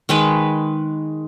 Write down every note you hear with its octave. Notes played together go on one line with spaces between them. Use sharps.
D#3 G#3 B4